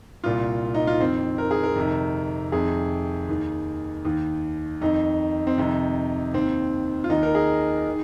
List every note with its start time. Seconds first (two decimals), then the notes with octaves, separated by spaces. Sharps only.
0.24 C2 A#2 F4
0.74 D#4
0.87 F4
0.99 F2 D#3 C4
1.38 A#4
1.51 G#4
1.63 A#4
1.76 F2 C3 D#3
2.52 F2 C3 D#3 G#4
3.29 D#2 D#3
4.05 D#2 D#3
4.81 F2 D#3 D#4
5.47 C4
5.58 F2 C3 D#3 D#4
6.33 D#2 D#3 C4
7.04 F4
7.09 D#2 D#3 D#4
7.23 A#4
7.35 G#4
7.89 D#3